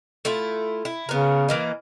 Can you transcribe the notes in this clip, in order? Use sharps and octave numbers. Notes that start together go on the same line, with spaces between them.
A3 E4 F4
E4
C#3 B3 A#4
E3 A#3 D#5